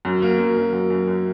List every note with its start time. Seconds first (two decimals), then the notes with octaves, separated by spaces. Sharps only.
0.05 F#2
0.22 A#3
0.39 F#2
0.57 F#2
0.73 F#2
0.90 F#2
1.08 F#2